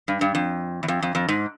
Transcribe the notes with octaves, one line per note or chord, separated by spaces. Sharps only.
G2
G2
F2
E2
F2
F2
F2
G#2